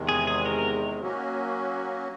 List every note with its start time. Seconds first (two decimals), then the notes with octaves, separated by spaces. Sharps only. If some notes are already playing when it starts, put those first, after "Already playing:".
Already playing: E2 C3 D#3 G#3
0.09 G#4
0.27 G#4
0.46 A#4
0.99 F#3 A#3 C#4 F#4